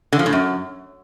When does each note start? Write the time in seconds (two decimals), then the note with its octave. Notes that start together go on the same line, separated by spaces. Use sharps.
0.13 D3
0.19 F3
0.26 A2
0.33 F#2